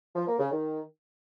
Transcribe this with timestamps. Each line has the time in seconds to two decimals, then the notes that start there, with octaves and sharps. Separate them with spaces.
0.15 F3
0.27 A#3
0.39 C#3
0.51 D#3